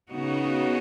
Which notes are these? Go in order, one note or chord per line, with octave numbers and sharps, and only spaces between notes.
C#3 B3 D#4 F#4